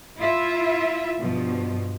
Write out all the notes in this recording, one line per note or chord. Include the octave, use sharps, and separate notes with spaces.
E4 F4 E5
G2 B2 F3